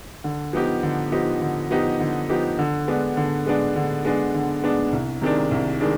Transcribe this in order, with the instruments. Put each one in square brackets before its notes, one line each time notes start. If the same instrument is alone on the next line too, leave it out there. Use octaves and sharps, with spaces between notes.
[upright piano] D3
F3 B3 D#4 G4
D3
F3 B3 D#4 G4
D3
F3 B3 D#4 G4
D3
F3 B3 D#4 G4
D3
G#3 B3 D4
D3
G#3 B3 D4
D3
G#3 B3 D4
D3
G#3 B3 D4
C2
C3 D#3 G#3 D4
C2
D#3 G#3 D4